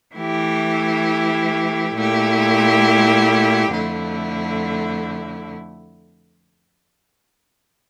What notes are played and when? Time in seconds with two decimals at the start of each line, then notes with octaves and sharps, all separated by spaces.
0.16 E3 A3 E4 G4
1.95 A#2 A3 E4 G4
3.73 F2 D3 A3 E4